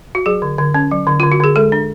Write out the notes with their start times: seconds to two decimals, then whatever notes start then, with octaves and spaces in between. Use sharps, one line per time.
0.15 F#4
0.26 F#3 G#4
0.42 D3
0.58 D3
0.74 C#4
0.91 F#3
1.07 D3
1.20 D3 F4
1.32 F#4
1.40 D3 G#4
1.56 G#3 A4
1.72 D4